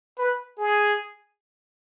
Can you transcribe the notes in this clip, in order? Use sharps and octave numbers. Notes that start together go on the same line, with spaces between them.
B4
G#4